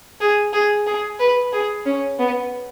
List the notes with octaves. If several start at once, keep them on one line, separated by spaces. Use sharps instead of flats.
G#4
G#4
G#4
B4
G#4
C#4
B3